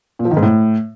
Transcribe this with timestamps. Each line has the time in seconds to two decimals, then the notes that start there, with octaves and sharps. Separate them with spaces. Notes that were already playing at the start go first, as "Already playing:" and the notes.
0.19 A#2
0.25 F3
0.31 D#3
0.37 G#2
0.43 A2